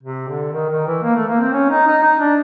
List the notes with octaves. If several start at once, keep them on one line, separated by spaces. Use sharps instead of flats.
C3
D3
D#3
D#3
E3
A#3
A3
A#3
C4
C#4
D#4
D#4
D#4
D4